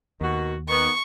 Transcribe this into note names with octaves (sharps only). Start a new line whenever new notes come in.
D#2 B2 D#3 F#4
D#3 B3 C#6